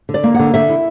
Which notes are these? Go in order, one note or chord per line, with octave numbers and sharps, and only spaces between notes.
D3
D5
A#3
F#5
D3
D3 E5
E4